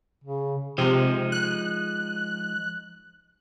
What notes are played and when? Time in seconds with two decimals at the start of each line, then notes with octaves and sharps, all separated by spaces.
0.24 C#3
0.78 C3 F3 G#3 D#4
1.32 F#6